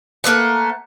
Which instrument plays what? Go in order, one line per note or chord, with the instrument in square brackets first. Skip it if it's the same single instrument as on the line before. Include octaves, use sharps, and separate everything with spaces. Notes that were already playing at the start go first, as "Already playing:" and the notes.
[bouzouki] A3 A#3 B4 F#5